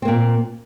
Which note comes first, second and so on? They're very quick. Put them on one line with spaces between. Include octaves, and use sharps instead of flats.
C4 A#3 A#2